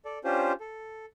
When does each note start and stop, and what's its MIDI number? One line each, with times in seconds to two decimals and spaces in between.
0.05 0.18 69
0.05 0.18 74
0.24 0.52 61
0.24 0.52 62
0.24 0.52 65
0.24 0.52 67
0.24 0.52 72
0.60 1.06 69